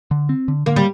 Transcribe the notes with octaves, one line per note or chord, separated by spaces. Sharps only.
D3
C4
D3
D3 A#3
G3